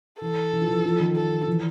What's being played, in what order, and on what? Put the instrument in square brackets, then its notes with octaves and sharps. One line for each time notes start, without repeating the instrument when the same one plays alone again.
[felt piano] E3 [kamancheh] A4
[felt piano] E3
F3
E3
F3
D#3
[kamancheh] A4
[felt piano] F3
E3